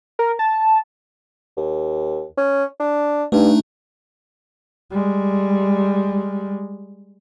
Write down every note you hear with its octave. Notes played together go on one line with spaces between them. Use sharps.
A#4
A5
D#2
C#4
D4
G2 A3 D4 D#4
G3 G#3